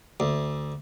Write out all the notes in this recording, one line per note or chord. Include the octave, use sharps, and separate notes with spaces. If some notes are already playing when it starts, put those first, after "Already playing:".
D2